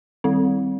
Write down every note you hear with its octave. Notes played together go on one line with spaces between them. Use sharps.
D#3 G3 C4